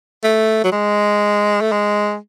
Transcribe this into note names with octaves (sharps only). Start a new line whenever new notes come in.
A3
F#3
G#3
A3
G#3